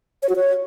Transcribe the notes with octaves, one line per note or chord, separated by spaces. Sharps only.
C#5
F#4
C#5